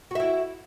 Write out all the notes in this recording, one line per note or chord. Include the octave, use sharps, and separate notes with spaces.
E4 F#4 E5